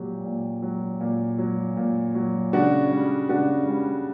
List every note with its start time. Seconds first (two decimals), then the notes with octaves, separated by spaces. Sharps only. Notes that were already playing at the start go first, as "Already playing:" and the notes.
Already playing: A#2 F#3 G4
0.24 A#2
0.62 F#3
1.01 A#2
1.38 F#3
1.77 A#2
2.15 F#3
2.53 C#3 D4 F#4
2.91 G3
3.29 C#3 D4 F#4
3.68 G3